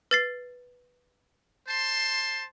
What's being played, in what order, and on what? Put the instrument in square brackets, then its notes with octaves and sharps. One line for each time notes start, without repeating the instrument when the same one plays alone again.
[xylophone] B4 A6 C7
[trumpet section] C5 A5 C6